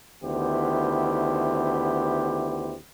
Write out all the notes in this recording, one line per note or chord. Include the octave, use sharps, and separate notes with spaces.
D2 D#3 B3 E4 G4 C5